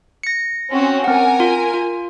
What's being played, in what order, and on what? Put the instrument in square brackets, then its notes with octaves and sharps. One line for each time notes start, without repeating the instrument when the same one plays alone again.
[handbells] A#6 C#7
[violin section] C4 C#4 F#4
[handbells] C4 F#5 [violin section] A#4 G#5
[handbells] F4
F4